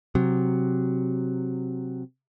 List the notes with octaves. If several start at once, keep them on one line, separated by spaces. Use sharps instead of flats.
C3 F#3